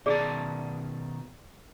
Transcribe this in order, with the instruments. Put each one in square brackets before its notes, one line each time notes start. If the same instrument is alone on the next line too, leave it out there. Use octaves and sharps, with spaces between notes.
[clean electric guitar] B2 D#3 A5 [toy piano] G#4 D5